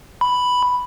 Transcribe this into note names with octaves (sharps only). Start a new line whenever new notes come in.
B5